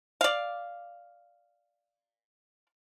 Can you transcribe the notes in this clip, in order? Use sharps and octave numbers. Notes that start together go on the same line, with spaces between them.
D5 F5